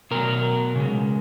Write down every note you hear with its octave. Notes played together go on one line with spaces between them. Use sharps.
B2 F#3 A#4
C#3 G#3